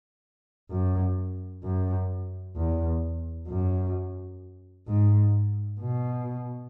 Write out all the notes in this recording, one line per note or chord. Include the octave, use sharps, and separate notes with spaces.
F#2
F#2
E2
F#2
G#2
B2